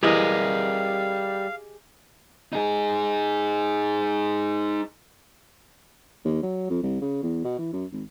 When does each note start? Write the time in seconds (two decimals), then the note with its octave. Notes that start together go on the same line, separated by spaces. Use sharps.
0.03 E3 G3 G4 G#4 A#4 D#5 F5 D#6
2.53 D#4 G#4
6.25 D#2
6.43 F#3
6.69 F2
6.83 C2
7.01 C#3
7.23 E2
7.44 B2
7.58 E3
7.73 F#2
7.92 G#1